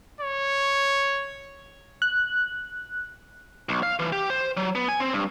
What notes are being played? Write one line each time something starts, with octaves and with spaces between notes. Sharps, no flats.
C#5
F#6
B1
F5
E3
G4
C5
F#3
B3
G#5
C4
G2